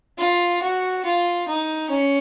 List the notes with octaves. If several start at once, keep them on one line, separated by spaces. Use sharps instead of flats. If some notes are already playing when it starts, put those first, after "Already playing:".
F4
F#4
F4
D#4
C#4